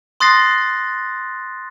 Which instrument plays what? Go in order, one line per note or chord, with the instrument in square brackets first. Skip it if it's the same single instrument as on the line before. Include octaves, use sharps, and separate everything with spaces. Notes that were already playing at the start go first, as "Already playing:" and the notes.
[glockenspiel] C6 D#6 F#6 A6 A#6 C7